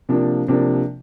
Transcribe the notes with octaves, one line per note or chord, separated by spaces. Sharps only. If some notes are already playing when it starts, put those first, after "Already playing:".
C3 F3 A#3 D4
C3 F3 A#3 D4